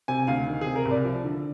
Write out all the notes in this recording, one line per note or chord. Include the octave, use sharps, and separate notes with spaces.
C3 G#5
D2 F5
D#3
C3 G#4
A#4
C2
D5
F3
D3